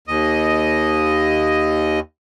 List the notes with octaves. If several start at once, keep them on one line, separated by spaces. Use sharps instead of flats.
D#2 D#5